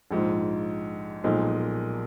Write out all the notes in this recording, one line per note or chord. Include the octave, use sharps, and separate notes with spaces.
A#1 G#2 F3
B1 A#2 F3 G#3 D#4